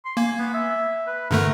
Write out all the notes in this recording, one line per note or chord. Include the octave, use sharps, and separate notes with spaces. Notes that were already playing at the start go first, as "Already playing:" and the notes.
C6
A#3 G#5
B3
E5
B4
G2 D3 A3 A#4